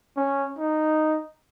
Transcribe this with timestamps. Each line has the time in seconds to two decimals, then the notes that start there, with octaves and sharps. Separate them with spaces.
0.17 C#4
0.59 D#4